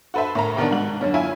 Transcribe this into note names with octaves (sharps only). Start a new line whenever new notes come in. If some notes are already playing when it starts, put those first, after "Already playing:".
F#4 A4 B4 C5 E5
A2 A#4 A#5
C3 D#3 B3 D4
G#2 F#4 F#7
F#2 D3 C#4
E4 F4 E5 G#5